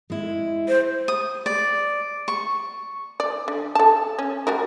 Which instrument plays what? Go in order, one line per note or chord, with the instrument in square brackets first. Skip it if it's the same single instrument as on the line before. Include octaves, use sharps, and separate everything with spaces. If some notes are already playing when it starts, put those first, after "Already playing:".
[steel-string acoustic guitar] G#3 E4
[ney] C5
[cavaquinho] D#6
D5
C#6
[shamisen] D5
D3
A4 A5
C#4
G3 F#4 A#4